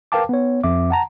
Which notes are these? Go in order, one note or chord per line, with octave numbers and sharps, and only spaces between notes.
A#4 B4 F5 G5 A5 D6
B3 C#5
F2 E5 D6
F#5 A5 A#5